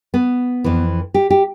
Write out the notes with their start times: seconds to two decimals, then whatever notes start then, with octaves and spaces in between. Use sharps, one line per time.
0.14 B3
0.64 F2 E3
1.14 G4
1.30 G4